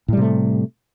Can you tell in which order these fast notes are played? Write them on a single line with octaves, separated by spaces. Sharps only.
A2 G3 C3 A3